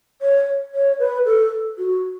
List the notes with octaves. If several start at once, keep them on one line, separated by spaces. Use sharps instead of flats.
C#5
C#5
B4
A4
F#4